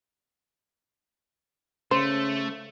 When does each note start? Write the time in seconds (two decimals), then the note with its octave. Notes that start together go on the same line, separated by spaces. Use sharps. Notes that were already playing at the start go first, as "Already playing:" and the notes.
1.91 C#3 A3 C5